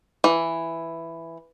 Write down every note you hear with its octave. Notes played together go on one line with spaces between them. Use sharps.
E3